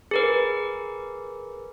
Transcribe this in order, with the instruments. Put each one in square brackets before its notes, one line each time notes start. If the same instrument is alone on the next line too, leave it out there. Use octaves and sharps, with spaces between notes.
[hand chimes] G#4 A#4 B4